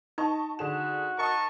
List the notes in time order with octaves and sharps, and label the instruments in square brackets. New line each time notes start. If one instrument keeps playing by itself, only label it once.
[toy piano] D#4 [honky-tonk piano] D#5 A5 C#6
[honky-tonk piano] D3 G#4 E7 [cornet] F#4
[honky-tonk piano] A#4 [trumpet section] D#5 A5 C#6